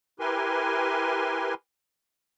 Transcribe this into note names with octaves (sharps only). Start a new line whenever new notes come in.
E4 G4 A#4 B4 G#5 C6